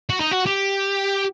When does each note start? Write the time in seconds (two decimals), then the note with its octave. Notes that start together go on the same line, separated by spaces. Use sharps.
0.10 F#4
0.20 D#4
0.31 F#4
0.46 G4